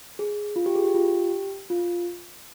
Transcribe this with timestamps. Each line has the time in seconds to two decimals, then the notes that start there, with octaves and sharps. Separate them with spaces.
0.19 G#4
0.56 F4
0.66 G4
0.75 G#4
0.84 G4
0.95 F4
1.13 G4
1.70 F4